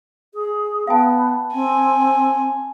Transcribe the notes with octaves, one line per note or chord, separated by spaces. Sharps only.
G#4
B3 F5 G5 A5
C4 G#5